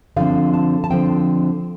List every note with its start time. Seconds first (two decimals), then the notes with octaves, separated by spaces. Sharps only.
0.16 D3 F3 C4 F5
0.54 A5
0.84 A5
0.90 D3 F3 C4 G5